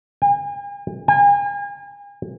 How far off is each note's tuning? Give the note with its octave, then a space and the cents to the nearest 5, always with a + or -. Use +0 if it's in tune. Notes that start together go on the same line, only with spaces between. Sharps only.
G#5 -45
G#5 -40